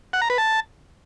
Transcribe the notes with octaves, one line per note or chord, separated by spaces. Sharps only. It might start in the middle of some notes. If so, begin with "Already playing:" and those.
F#5
A#5
B4
A5